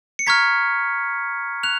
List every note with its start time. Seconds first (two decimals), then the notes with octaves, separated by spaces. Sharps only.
0.19 C#7
0.27 A#5 C#6 F6 G#6 B6
1.63 F#6 F7